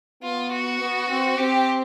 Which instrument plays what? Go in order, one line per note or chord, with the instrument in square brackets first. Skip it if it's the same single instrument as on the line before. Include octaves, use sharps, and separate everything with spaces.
[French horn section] B3 [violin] F4
[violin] F#4
[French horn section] B3
C4
[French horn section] C4 [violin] G4